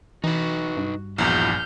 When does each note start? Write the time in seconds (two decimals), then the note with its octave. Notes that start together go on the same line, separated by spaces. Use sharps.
0.24 E3 D#4 F#4 B4
0.77 G2
1.18 A#1 E2 E4 F#4 F6 G6